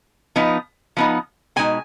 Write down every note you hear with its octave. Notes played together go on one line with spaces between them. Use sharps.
F3 B3 D#4
F3 B3 D#4
B2 G#3 D#4 G#5